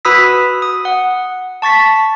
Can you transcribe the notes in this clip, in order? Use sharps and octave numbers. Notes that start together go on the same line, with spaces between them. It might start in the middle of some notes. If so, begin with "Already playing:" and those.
F#4 B4 B5 D#6 E6 B6
D#6
F#5
A5 C#6 A6 B6